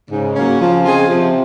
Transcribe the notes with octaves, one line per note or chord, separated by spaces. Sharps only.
G#2 C#3
F#3 A#3 C#4
F3
C4 F4 G#4 D#5
C3 F3